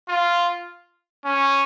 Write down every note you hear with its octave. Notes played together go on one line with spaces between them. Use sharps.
F4
C#4